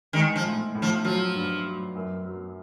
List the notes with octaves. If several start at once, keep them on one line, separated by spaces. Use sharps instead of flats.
D#3 G#3
F3
A2
A2
F3
F3 F#3
G2
F#3
F#2
F#3